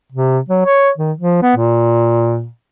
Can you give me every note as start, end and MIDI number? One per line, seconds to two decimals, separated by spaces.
0.12 0.39 48
0.49 0.62 54
0.65 0.90 73
0.98 1.12 51
1.18 1.42 53
1.42 1.52 59
1.56 2.47 46